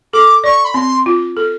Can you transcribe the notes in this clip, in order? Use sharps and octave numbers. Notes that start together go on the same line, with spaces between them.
A4 D6
D5 C#6
B5
C4 C6
F4
A4